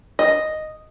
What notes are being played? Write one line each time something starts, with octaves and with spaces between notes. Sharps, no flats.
D#5